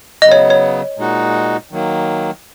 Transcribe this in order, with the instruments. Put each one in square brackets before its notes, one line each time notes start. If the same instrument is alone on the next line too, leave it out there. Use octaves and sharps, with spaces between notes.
[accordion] C#3 F#3 B3 [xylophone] D#5
[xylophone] C#5
C#5
[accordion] A#2 G#3 D#4 F#4
D#3 F#3 A#3